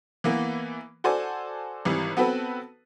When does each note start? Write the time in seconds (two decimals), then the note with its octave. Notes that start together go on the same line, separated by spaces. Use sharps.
0.24 E3 A#3 B3
1.04 F#4 A4 C5 D5 G#5
1.85 G#1 E3 G3
2.17 B3 C4 F#4 A4 B4